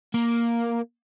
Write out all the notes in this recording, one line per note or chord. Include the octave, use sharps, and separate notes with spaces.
A#3